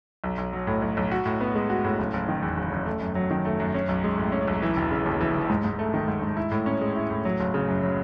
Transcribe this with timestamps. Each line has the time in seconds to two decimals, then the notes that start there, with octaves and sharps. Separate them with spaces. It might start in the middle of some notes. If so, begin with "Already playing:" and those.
0.24 B1
0.38 B1
0.53 F#3
0.67 A2
0.82 B1
0.97 B1
1.12 F#4
1.26 A2
1.41 B3
1.55 G#3
1.70 F#4
1.84 A2
1.99 F#1
2.13 F#1
2.29 D#3
2.43 E2
2.57 F#1
2.72 F#1
2.86 A3
3.01 F#2
3.15 F#3
3.31 D#3
3.45 A3
3.60 F#2
3.75 C#4
3.89 B1
4.04 G#3
4.18 A2
4.32 C#4
4.48 B1
4.62 E3
4.76 E1
4.91 C#3
5.06 D#2
5.21 E3
5.34 E1
5.50 G#2
5.64 G#2
5.79 A3
5.94 D#3
6.08 G#2
6.22 G#2
6.37 E4
6.51 A2
6.66 C#4
6.82 G#3
6.96 E4
7.11 A2
7.25 F#3
7.40 F#1
7.54 C#3
7.68 F#2
7.83 F#3